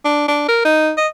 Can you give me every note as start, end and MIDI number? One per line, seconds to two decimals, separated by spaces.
0.05 0.24 62
0.28 0.46 62
0.49 0.64 70
0.65 0.92 63
0.97 1.07 75